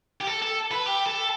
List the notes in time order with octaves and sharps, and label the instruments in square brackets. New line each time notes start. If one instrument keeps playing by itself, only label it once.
[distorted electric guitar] G4
A4
A4
B4
G4
A4